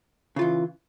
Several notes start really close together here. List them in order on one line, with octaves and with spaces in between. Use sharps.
C#3 F4 E3